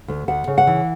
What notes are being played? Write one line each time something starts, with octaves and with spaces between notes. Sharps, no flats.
D2
D2 F#5
C#3
F#5
E3